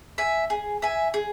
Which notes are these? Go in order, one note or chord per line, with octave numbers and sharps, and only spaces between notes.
E5 G#5
G#4
E5 G#5
G#4